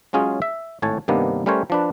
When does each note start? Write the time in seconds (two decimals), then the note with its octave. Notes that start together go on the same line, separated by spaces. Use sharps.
0.13 F#3 G#3 C#4 F4 G#4
0.42 E5
0.82 G#1 A2 C#5 G#5 A5
1.08 G2 C3 D#3 A#3 B3 D4
1.46 G3 A3 C#4 A#4 C5 C#5
1.70 F3 D4 B4